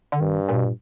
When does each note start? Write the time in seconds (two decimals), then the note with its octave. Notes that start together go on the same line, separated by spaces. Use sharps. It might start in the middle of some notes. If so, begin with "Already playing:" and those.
0.12 D3
0.20 G2 D#3
0.49 A#2
0.57 B2
0.66 A#2